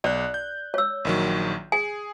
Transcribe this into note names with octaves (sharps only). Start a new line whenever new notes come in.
B1 D5 F#6
G6
C#5 E6
A#1 D#3 F#3
G#4 G#5